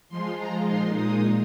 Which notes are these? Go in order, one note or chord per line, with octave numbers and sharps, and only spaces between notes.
F3 G#3 F4 C6
A#5
A#2 G#3 D#4 C6
D#6